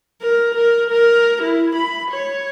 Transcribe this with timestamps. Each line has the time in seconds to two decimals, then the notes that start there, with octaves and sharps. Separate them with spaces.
0.22 A#4
0.54 A#4
0.91 A#4
1.42 E4
1.75 B5
2.11 C#5